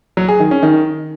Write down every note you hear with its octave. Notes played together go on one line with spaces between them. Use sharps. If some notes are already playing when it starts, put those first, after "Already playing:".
F#3
G#4
D#3
C#4
D#3